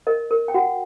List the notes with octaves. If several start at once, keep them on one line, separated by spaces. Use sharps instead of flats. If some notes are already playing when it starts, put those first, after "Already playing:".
A#4 D#5
A#4
G5
F#4 F#5